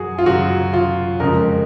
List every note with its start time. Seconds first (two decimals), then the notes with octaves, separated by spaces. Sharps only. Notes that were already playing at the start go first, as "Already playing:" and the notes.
Already playing: F#2 F#3 F#4 G#4
0.18 F4
0.26 F#2 C#3 F#3 F#4
0.74 F4
1.20 F2 C#3 G#3 A#4